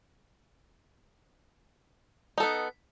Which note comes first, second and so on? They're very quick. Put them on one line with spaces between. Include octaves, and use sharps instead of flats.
D#4 A4 B3